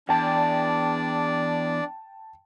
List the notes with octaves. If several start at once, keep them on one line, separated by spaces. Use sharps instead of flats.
E2 D4 D5 G5 A5